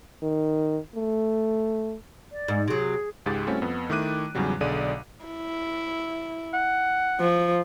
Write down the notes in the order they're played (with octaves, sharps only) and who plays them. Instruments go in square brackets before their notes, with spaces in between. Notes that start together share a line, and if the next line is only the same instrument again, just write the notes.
[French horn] D#3
A3
[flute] D5
[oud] G#2
[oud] C3 F#3 [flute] G#4
[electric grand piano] C#2 G#2 G4 G#4 A6
G3 A3 C4 C#4 E4 F#4
F2 B3
D#3 A3 E4 D6 F#6 D#7
E2 G#2 C#3 F#3 G3
B1 D3 G#4 D5 D#7
[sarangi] E4
[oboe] F#5
[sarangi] F3